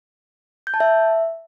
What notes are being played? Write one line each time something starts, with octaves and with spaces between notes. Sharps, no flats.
G6
A5
E5